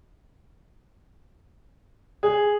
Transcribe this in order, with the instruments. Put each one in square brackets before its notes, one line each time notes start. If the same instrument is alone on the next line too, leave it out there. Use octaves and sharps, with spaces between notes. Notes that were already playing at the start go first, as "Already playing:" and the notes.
[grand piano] G#4